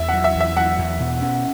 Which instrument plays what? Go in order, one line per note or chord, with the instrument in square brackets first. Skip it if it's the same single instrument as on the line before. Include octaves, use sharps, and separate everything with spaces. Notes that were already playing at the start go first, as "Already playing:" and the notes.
Already playing: [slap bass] E2 [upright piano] E5
[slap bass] F#3 [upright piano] F#5
[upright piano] E5
[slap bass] E2 [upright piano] E5
[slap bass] F#3 [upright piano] F#5
[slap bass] E2
B2
C#4